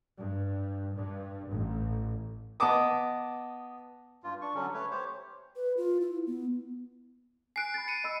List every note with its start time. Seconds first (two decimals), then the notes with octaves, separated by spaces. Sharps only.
0.17 G2
0.93 G2
1.50 A1
2.60 B3 D#5 A5 D6 D#6
4.24 G2 F4
4.42 D4 C#6
4.55 D3 F#3 G3 C#4
4.74 A3 B4 C#5
4.91 G4 C5 C#5
5.56 B4
5.77 F4
6.01 E4
6.27 B3
7.56 G#5 F#6 C7 D7
7.74 B5 F#6 A6
7.88 C#7 D#7
8.04 D#5 B5 E6